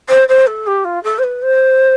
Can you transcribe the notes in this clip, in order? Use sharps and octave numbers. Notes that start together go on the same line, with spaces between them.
C5
C5
A4
G4
F4
A4
C5
B4
C5